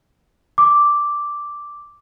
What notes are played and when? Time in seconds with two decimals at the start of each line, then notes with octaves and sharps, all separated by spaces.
0.58 D6